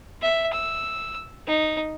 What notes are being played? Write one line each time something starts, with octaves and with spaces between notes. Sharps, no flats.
E5
E6
D#4